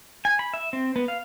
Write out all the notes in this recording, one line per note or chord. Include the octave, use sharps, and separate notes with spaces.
G#5
B5
E5
C4
B3
F5